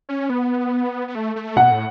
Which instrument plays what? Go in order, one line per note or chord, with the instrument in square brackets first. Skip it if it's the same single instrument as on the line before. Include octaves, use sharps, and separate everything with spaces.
[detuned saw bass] C#4
B3
B3
A3
A3
[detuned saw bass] B2 [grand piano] F#5
[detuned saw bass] A2